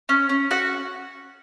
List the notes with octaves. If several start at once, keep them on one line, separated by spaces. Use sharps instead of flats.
C#4
C#4
F#4 F#5